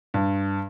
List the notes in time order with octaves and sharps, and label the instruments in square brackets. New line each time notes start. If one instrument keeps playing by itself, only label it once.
[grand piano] G2